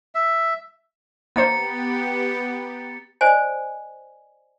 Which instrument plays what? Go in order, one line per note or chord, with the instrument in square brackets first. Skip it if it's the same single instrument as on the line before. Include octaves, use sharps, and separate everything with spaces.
[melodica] E5
[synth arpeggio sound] A#3 D4 C5 [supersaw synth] B3 G4 [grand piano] A#5 [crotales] A6 C#7
[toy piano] C5 D5 D#5 G#5